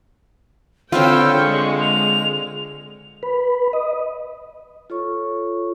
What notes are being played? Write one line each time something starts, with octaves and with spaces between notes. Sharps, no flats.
D3 C4 F4 B4 C#5 G5 E6
G#3 C#6
F7
B4
D#5
F4 A4 C#5 C#6